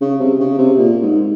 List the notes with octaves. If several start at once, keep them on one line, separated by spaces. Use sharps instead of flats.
C#3
C3
C#3
C3
A#2
G#2